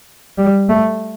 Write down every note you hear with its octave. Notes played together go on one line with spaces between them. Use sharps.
G3
A3